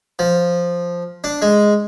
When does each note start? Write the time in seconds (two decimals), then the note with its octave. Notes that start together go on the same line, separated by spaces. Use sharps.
0.19 F3
1.24 D4
1.42 G#3